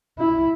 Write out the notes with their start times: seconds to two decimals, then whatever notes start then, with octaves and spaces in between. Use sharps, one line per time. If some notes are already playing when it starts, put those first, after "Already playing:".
0.19 E4